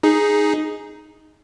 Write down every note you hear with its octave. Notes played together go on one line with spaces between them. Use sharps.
D#4 G#4